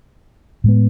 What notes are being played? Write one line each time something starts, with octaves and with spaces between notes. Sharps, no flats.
A2 G#3 B3